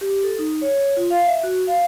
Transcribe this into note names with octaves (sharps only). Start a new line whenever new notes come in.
G4
A4
D#4
C#5
F4
F5
E5
F#4
F5